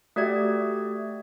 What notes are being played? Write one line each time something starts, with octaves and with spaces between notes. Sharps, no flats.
A3 F#4 G4 D5 E5 G#6